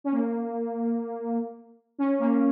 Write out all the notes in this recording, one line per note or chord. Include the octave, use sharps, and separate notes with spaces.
C#4
A#3
C#4
A#3